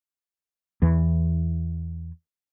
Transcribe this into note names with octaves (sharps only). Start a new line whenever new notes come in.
E2 E3